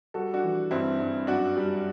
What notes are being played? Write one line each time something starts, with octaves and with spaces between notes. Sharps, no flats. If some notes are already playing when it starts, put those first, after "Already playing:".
G3 F#4 A4
D4 F#4
E3
G2 C4 E4
G2
F#2 D4 F#4
G3